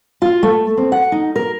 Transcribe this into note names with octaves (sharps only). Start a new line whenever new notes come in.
F4
A3
C4
F#5
D#4
A#4